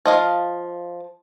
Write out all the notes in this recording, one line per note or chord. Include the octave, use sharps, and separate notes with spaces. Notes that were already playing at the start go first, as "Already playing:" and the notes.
F3 D#5 F5